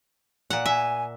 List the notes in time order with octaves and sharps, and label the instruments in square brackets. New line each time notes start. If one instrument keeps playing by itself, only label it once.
[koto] A#2 F#5
[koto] E5 [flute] G#5